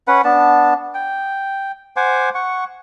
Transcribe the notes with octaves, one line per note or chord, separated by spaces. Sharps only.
C#4 B4 F#5
B3 D4 A5
G5
C5 F#5 G#5 D6
F#5 C#6